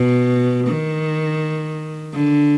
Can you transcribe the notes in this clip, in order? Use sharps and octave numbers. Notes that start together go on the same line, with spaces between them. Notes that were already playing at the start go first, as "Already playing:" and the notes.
Already playing: B2
D#3
D3